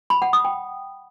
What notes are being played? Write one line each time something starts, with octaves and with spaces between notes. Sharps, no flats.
B5
F#5
D#6
G5